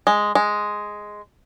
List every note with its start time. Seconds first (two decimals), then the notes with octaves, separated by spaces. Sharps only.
0.07 G#3
0.35 G#3